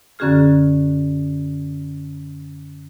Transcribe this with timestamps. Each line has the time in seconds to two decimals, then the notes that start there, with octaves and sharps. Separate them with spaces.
0.19 F#2 D3 C#4 F#4 G#4 F6